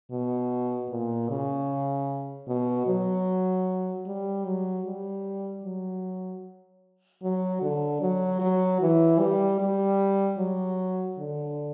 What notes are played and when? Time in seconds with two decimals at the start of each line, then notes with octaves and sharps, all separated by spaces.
0.11 B2
0.90 A#2
1.29 C#3
2.48 B2
2.87 F#3
4.06 G3
4.45 F#3
4.86 G3
5.64 F#3
7.23 F#3
7.62 D3
8.01 F#3
8.40 F#3
8.81 E3
9.20 G3
9.60 G3
10.38 F#3
11.18 D3